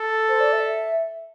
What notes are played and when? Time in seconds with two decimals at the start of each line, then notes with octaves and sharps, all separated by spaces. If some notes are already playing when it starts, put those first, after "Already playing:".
Already playing: A4
0.29 C5
0.40 D5
0.53 E5